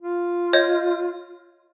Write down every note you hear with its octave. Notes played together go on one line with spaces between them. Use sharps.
F4
C#5 D#5 G6